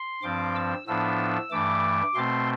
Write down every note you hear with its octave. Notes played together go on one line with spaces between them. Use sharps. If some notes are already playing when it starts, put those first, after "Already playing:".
Already playing: C6
G2 F3 C4 D6
E6
A2 F3 B3 D4 E6
G2 E3 A3 D6
B2 A3 C4 C6